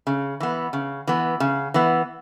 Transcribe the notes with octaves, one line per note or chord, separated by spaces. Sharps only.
C#3
E3 B3
C#3
E3 B3
C#3
E3 B3